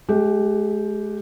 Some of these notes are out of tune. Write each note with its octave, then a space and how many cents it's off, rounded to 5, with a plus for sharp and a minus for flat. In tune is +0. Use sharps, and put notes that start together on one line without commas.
G#3 +40 G4 +0